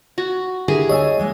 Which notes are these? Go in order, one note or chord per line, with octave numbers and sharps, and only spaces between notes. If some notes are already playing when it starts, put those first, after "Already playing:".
F#4
D3 E4 G4 G#4 A#4
D2 A3 C#5 D#5 G#5 E6
E3 G#3 A#3